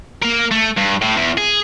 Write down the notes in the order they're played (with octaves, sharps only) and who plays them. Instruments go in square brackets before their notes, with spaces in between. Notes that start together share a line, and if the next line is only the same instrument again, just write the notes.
[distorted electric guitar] A#3 A#4
A3
G2
A2
E2
G#4